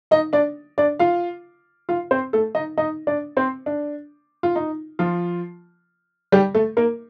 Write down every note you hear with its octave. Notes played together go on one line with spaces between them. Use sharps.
D#4 D#5
D4 D5
D4 D5
F4 F5
F4 F5
C4 C5
A3 A4
D#4 D#5
D#4 D#5
D4 D5
C4 C5
D4
F4
D#4
F3 F4
G3 G4
A3 A4
A#3 A#4